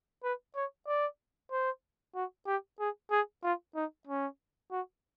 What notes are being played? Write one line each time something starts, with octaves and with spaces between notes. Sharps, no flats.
B4
C#5
D5
C5
F#4
G4
G#4
G#4
F4
D#4
C#4
F#4